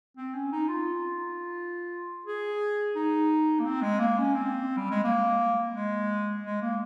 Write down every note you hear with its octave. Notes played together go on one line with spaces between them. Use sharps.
C4
C#4
D#4
F4
G#4
D#4
A#3
C4
G#3
A#3
C#4
C4
G3
G#3
A#3
G#3
G#3
A#3